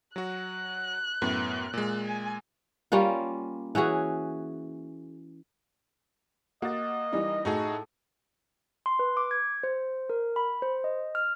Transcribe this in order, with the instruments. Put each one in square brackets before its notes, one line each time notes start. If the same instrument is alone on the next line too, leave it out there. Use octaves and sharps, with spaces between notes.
[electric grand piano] F#3 F#4 [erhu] F#6
[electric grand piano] F#2 A2 B3
A#2 G#3
[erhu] G#5
[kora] G3 A#3 C#4 F4
E3 C#4 F#4 G#4
[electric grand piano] A#3 [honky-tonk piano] F#4 A6 [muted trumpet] D#5
[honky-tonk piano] E3 G3 D#4
[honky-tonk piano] A2 [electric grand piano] D#4 F#4 G#4 [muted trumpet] A4
[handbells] C6
B4
D6
G#6
C5
A#4
B5
C5
D#5
F6